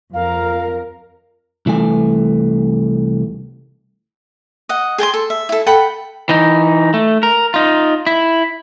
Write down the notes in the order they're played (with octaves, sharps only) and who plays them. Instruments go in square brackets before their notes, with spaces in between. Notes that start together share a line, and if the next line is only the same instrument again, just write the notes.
[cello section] F2 A#4 [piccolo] F5
[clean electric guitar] C2 E3 A3 G#5
[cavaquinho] D#5 F#5
G#4 G5 G#5 C6
A4
E5
E4 A4
A4 F#5 G5 B5
[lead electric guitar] E3 D#4
A3
A#4
D#4 F4
E4